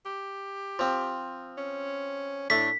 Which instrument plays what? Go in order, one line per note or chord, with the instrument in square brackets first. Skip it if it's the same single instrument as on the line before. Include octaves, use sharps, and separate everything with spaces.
[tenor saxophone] G4
[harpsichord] F3 C4
[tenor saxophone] C#4
[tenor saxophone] A2 [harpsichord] A3 D4 [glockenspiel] B6